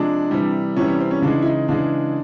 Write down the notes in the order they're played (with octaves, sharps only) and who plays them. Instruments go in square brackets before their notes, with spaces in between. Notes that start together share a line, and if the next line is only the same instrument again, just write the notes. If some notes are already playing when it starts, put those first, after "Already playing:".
Already playing: [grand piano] C3 F3 G#3 D4
C3 E3 G3
C3 E3 G3 C#4
C#4
C4
C#4
C#3 E3 G#3 D4
E4
D#4
C#3 E3 G#3 D4